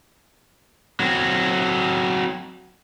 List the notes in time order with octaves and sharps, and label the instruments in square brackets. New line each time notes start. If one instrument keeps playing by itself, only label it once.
[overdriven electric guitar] F#3 C4